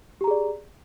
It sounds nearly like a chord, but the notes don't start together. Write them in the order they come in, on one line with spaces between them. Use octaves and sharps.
G4 A#5 G#4 D5